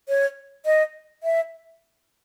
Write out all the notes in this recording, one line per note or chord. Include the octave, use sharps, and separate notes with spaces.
C#5
D#5
E5